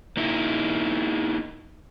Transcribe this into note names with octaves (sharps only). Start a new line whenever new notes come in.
A#3 D#4 E4